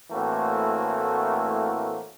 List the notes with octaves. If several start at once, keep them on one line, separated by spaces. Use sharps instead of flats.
A2 E3 A3 A#3 C4 F#4